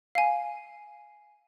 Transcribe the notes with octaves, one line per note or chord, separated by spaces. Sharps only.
F5 G#5